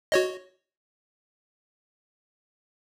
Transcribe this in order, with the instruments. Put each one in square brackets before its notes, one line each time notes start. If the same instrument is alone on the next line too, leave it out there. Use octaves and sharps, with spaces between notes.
[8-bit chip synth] F#4 C#5 D#5